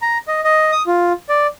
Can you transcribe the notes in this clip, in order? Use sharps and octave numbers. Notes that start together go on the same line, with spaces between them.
A#5
D#5
D#5
D#6
F4
D5